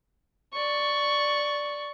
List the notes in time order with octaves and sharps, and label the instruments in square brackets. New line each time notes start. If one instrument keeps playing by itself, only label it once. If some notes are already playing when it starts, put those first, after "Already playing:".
[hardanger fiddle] D5 C#6